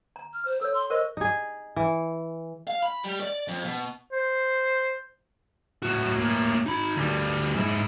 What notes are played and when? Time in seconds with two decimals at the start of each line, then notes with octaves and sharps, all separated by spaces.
0.16 A#5
0.33 F6
0.45 C5
0.61 A4 C#5 E6
0.74 C6
0.90 A#4 C5 D#5 C#6
1.17 D#4 G#4
1.76 E3
2.67 F5
2.83 B5
3.04 G3
3.21 D5
3.48 F2
3.64 B2
4.12 C5
5.82 A2 F#4
6.18 A2 A#3
6.66 D#4 B5
6.96 D2 G3
7.56 G#2 E4